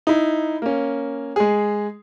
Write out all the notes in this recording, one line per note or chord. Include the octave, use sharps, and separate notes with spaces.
D#4 E4
A#3 C#4
G#3 G#4